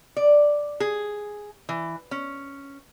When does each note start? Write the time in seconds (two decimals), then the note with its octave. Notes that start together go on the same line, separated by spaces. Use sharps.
0.17 D5
0.80 G#4
1.69 E3
2.11 C#4